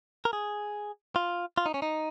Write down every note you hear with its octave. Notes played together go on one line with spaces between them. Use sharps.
A#4
G#4
F4
F4
D#4
C#4
D#4